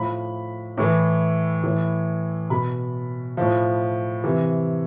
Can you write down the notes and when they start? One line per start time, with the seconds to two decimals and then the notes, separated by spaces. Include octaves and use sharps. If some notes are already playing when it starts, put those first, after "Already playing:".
Already playing: A2 F3 B5
0.77 A2 E3
1.64 A2 E3
2.50 B2 B5
3.37 A2 F3
4.24 C3 E3